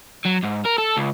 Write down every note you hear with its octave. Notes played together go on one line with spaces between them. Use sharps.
F#3
G#2
A#4
A4
C#2